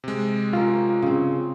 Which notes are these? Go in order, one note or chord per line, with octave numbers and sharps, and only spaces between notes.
C3 G#3
C#4 F4 G4 A#4
C#3 C4